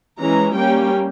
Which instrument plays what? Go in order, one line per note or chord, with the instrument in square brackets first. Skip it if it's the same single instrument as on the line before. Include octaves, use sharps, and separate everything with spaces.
[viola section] E3 G#3 C#4 A#5
G3 A#3 C#4 G5